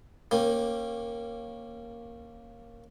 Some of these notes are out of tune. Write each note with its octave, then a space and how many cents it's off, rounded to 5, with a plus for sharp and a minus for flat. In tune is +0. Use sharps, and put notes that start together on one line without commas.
A#3 +0 C#4 -20 G4 +0